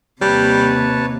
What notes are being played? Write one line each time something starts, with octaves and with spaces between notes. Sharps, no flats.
D#2 C3 G3 B4 C#5 A5